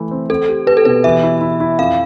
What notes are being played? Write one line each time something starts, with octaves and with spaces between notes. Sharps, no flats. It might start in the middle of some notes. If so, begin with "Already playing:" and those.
Already playing: E3 A3 E4
C4
C4 A4
G4
G4 B4
A4
B2 B4
E3 E5
E4
E4
E4
F2 F5